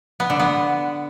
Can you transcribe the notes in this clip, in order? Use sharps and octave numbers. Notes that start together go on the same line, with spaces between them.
B3
D3
B3